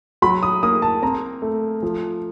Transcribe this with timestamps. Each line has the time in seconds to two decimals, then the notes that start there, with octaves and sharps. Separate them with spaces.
0.22 F#3 B5
0.43 D#6
0.63 A#3 D#6
0.82 A5
1.02 C4 A#5
1.42 A3
1.83 F3